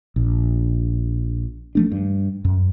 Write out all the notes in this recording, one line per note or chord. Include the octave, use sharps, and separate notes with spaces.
A#1
F3 A3 D4
G2
F#2